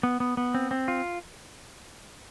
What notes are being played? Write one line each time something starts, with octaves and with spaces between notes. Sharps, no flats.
B3
B3
B3
C4
C4
F4